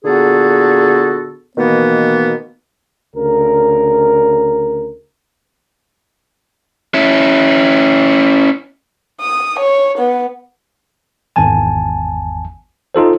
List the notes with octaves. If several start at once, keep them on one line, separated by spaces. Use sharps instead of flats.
A#2 D3 B3 F#4 G#4 A4
B2 D#3 E3 A#3 B3
D2 C#3 A#4
C#4 E4
D#6
C#5
B3
G#1 E2 G#5 A5
D#4 F4 A4 C5